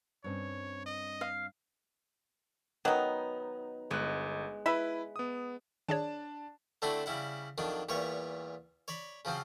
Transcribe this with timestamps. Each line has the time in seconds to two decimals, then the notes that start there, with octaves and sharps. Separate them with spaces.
0.24 G2 C4 C#4 C#5
0.86 D#5
1.21 F5
2.85 D#3 F#3 B3 D#4
3.91 G1 G#3 F#6
4.66 E4 B4 E5 B5
5.16 B3 D#6
5.89 D#3 D4 G#4 C#5 A5
6.82 D3 A3 C4 D4 E4 F#4
7.06 C#3 G3 E4 F#5
7.58 F2 D#3 F#3 D4
7.89 E2 A#2 G3 C#5 C#6
8.88 C#5 D5 B5
9.25 C#3 F3 F#3 C4